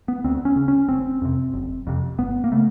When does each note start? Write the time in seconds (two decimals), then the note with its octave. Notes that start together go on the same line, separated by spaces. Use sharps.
0.08 B3
0.24 D2 C4
0.45 C#4
0.56 C#3
0.68 C#4
0.88 F#1 C4
1.22 F2 C3
1.53 F#1
1.87 F2 C3
2.18 G1 B3
2.44 A#3
2.52 C#3 A3